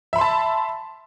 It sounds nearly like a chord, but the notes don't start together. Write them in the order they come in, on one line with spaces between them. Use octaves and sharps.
E5 B5 C6 A5